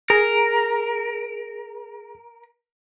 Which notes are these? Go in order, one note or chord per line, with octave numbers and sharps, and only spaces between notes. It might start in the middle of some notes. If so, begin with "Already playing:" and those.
G#4 A#4